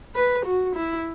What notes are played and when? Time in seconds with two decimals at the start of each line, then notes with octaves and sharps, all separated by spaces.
0.15 B4
0.45 F#4
0.76 E4